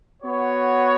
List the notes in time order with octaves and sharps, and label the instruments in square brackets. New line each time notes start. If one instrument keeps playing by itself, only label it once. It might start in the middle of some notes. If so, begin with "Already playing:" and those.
[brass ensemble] B3 F#4 C#5